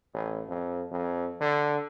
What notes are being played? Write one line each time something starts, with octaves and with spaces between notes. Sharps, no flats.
A1
F2
F2
D3